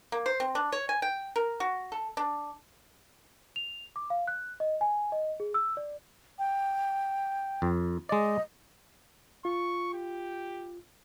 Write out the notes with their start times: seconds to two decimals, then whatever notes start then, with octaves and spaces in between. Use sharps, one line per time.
0.12 A#3
0.26 C5
0.40 C4
0.55 D4
0.72 C#5
0.89 G#5
1.02 G5
1.36 A#4
1.60 F#4
1.92 A4
2.17 D4
3.56 F7
3.96 D6
4.10 F5
4.28 F#6
4.60 D#5
4.81 G#5
5.12 D#5
5.40 G#4
5.54 E6
5.77 D5
6.39 G5
7.62 F2
8.09 G#3 D5 D#5
9.45 F4 C#6
9.94 G4